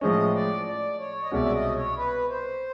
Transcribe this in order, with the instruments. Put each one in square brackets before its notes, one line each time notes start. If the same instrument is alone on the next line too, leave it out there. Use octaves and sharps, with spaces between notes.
[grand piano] A2 F3 G#3 C#4 [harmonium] D#5
[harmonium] D5
D5
C#5
D#5
[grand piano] C2 B2 G#3 C#4 F#4 [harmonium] D5
[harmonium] E5
D#5
C#5
B4
C5